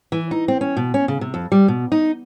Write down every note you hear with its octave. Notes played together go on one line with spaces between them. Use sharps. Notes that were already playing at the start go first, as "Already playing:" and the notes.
E3
D#4
C4
C#4
B2
C#4
C#3
C3
F2
G3
B2
D#4